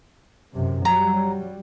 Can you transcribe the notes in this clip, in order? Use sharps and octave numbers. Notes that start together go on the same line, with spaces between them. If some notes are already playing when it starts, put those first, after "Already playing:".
F#2 C3
F#3 G3 A#5